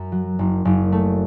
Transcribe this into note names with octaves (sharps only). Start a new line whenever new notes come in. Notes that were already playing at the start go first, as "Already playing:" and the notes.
Already playing: F#2
F#3
F#1
F#1
A3